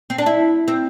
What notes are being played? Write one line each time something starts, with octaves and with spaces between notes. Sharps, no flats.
C4
D4
E4
C4